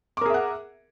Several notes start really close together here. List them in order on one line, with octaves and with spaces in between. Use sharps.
D6 A#4 G#4 E5 F#5